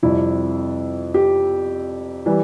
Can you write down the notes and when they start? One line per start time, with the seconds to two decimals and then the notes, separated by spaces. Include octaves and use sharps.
0.03 F2 C3 G3 E4
1.14 G4
2.26 E3 G3